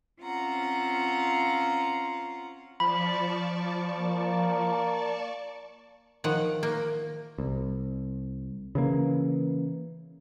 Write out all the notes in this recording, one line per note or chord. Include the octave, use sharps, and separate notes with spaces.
C4 C#4 F4 F5 F#5 A#5
F3 D5 A5 B5 C#6
A#3
D#3 F3 F#5
A#3
C2
C#3 E3 A#3